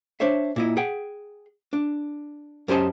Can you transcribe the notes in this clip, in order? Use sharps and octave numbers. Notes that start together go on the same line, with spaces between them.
D4 C5 C#5 E5
A#2 E4 D#5
G#4 F#5 G5
D4
F#2 C#4 G4 C5 D#5 A5